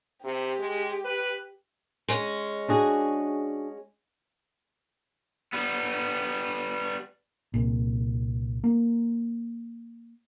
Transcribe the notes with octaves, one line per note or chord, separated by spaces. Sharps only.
C3 G4
G#3
B4
G#3 C#4
D4 F#4 G#4
G3 B3
C2 A#2
A#3